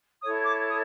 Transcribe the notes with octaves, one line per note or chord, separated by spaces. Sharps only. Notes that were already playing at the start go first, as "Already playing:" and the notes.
E4 A4 C#5 D#6
D6
D#6